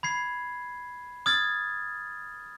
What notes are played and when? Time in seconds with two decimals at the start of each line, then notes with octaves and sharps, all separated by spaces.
0.03 B5 G#6 C7
1.26 D#6 F6 G#6 A6